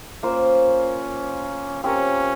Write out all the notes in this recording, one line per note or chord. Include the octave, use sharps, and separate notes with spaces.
A#3 C#4 F4 C5
C4 C#4 G4 A#4 C#5